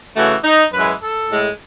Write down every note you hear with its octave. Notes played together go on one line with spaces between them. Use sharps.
C#3 E3 A3 F#4
D#4
F#2 E3 G#3 B4
A4
A2 G#3